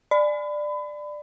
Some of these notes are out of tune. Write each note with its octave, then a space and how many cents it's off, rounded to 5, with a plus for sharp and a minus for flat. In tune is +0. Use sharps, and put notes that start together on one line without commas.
D5 +15 B5 +30